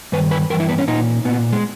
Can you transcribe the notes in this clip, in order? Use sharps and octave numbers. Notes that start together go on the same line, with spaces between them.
G2 D#3 B4
B4
G2 E3 A#4
E4
B3
C#4
A#2 D#4
A#2 B3
G#3